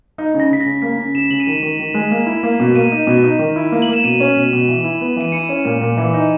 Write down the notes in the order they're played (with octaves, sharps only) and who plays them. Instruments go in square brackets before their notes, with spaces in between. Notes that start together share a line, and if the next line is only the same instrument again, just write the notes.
[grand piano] D#4
C#3
[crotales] A#6
[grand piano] C#3 [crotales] B6
[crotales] A#6
[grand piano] C#3
[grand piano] A#3 [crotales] B6
[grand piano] C#3
[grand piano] C#3 [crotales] E7
[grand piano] C#3 [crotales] F#7
[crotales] D#7
[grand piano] D#3 [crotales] E7
[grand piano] D#3
D#3
G#3
A#3
E4
A#3
B2
[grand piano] A#3 [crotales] D#7
[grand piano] D#4
B2
D#4
D#3
E4
A#3
[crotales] F#7
[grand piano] A#3
[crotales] E7
[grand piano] B2 [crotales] D#7
[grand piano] C#4
B2
B2
E3
E4
B3
[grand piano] E3 [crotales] D#7
[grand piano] E4 [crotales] C#7
[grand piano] C#4
A#2
A#2
E3
D#4